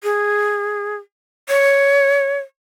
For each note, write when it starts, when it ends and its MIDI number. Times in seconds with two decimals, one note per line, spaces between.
0.04 0.96 68
1.49 2.38 73